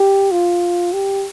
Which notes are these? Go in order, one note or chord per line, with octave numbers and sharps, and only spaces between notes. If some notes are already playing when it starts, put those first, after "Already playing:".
Already playing: G4
F4
G4